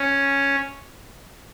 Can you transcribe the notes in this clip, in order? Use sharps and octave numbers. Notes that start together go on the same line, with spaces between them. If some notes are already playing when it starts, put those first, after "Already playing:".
Already playing: C#4